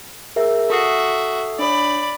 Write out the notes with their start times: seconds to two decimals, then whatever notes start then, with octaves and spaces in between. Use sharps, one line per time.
0.36 G#4 A#4 E5
0.70 F#4 A4 E5 D#6 C7
1.59 D4 C#5 D5 B5